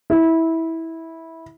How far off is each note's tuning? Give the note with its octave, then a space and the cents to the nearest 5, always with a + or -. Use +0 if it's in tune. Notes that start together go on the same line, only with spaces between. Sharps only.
E4 -15